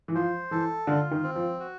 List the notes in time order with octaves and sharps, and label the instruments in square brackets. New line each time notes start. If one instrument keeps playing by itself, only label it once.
[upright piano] E3
[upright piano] F3 [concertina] C5
[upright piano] E3 [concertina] A4
[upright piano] D3 [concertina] F4
[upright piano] D#3
[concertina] C4
[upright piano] F3
[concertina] F#4